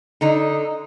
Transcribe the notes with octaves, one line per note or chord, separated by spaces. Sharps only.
D3 D#4